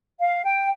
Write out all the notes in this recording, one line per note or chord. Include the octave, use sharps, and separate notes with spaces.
F5
G5